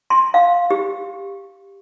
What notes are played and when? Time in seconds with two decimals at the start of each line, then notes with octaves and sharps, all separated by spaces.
0.10 C6
0.34 F5
0.71 G4